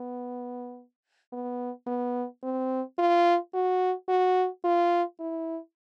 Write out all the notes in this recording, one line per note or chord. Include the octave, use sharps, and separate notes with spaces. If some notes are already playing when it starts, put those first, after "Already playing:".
Already playing: B3
B3
B3
C4
F4
F#4
F#4
F4
E4